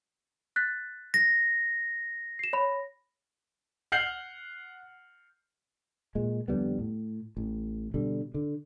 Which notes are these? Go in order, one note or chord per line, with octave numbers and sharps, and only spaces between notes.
F#6 A6 B6
A#6
C7 E7
C#5 B5
F#5 F6 G6 C7 F#7
A#2 G#3
F2 D3 G3 B3
A2
A1
B2 D3 G3
D3